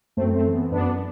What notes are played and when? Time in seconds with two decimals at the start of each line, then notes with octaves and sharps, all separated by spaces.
0.17 F#2 A3 C4
0.35 A3 C4
0.45 E3
0.53 B3
0.72 F#2 B3 D4